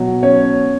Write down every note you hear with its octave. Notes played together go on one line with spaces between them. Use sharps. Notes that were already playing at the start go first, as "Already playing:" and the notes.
Already playing: B2 F#3
C#4 C#5